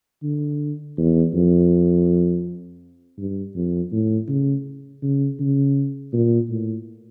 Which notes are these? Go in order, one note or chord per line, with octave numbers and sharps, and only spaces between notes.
D3
E2
F2
G2
F2
A2
C#3
C#3
C#3
A#2
A2